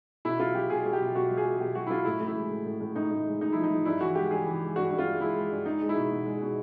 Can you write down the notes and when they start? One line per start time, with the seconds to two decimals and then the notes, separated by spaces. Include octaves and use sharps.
0.25 B2 E4
0.40 F#3 F4
0.55 F#3 G4
0.70 B2 G#4
0.85 F#3 G#4
0.93 G4
1.00 B2
1.15 B2 F#4
1.31 F#3
1.37 G#4
1.45 F#3
1.61 B2 G4
1.75 F#3 F#4
1.87 E4
1.90 F#3 F4
2.05 A2 E4
2.20 A2
2.27 E4
2.35 G#3
2.50 A2
2.65 A2
2.80 A2
2.95 A2 D#4
3.11 A2
3.25 G#3
3.41 A2 D#4
3.52 F3 E4
3.63 D#4
3.70 F3
3.85 G2 E4
4.01 E3 F#4
4.15 G#3 G4
4.31 G2 G#4
4.46 E3
4.61 G#3
4.76 G2 F#4
4.91 G2
4.99 F4
5.05 G2
5.21 G#3 E4
5.36 G#3
5.51 G2
5.66 G#3 D#4
5.82 G#3
5.89 E4
5.96 B2
6.11 B2
6.26 G#3
6.41 B2